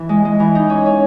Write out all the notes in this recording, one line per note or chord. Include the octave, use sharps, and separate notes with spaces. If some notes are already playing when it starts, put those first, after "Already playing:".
Already playing: E3
G#3
G#3
E3
D#4
C#4
C#4